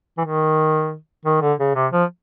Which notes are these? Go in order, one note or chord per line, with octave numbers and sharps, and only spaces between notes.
E3
D#3
D#3
D3
C#3
C3
F3